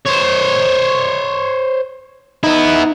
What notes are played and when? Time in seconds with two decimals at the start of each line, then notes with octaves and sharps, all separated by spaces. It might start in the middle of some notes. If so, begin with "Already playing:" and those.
0.06 C5 C#5
2.43 B3 D#4 E4